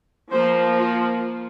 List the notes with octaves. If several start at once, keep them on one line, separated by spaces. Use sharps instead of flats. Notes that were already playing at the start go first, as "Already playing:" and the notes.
F3 A#3 C5
F4